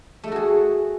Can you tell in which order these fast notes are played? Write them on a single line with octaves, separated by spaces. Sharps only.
A3 A4 F#4 G#4